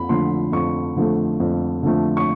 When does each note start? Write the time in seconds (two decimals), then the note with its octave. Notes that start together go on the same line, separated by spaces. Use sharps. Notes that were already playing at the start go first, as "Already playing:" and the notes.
Already playing: F2 B5
0.09 D3 F3 A3 C6
0.52 F2 C#6
0.96 D3 F3 A3
1.40 F2
1.83 D3 F3 A3
2.17 C#6